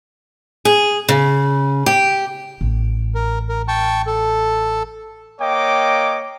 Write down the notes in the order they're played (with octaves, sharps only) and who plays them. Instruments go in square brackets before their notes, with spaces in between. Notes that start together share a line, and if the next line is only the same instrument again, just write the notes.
[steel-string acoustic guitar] G#4
C#3
G4
[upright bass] A1
[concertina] A#4
A#4
G5 A5 C#6
A4
[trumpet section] A#3 C#5 D#5 G5 D6